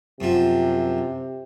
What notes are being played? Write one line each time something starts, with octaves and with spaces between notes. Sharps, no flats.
F#2 C3 F3